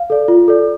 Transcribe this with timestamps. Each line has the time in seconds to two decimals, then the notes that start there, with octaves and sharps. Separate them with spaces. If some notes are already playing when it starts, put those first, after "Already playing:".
Already playing: F5
0.10 A4 D5
0.28 F4
0.48 A4 D5